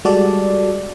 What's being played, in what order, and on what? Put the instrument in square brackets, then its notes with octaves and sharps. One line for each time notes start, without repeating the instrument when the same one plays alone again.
[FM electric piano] G3 G#3 F#4 A4 D5